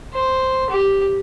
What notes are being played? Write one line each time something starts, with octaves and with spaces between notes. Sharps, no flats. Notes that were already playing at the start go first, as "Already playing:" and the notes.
C5
G4